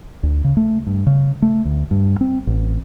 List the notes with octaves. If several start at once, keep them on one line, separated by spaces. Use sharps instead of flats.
D2
C#3
A3
G2
C#3
A3
D2
G2
C4
A1